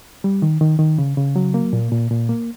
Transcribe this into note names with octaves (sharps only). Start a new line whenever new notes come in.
G3
D#3
D#3
D#3
C#3
C#3
F#3
A#3
A#2
A#2
A#2
A#3